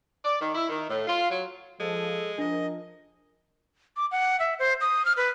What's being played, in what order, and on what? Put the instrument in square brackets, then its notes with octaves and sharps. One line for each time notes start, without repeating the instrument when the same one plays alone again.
[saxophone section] D5
D#3
E4
D#3
A2
F4
F#3
[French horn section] F3 [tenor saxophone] G#3 [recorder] A4
[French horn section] F3 A#4 [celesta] D4 [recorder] D#5
[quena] D6
F#5
E5
C5
D#6
F6
B4